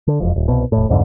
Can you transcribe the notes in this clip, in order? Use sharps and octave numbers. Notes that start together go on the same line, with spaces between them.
D3
E1 F2
D#1
C2 B2
E1 A2
C2 F2 G#2 D3